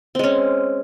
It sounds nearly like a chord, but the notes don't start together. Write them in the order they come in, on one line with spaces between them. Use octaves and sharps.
C4 G#3 C#4